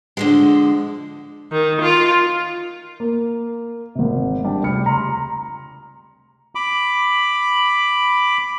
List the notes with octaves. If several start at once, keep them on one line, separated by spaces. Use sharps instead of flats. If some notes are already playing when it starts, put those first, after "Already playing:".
D3 F3 G#3
D#3
F4
A#3
G#1 C3
G3 D4
F1 C#2 G4 B5 F6 C#7
A#5 C6
B5 D6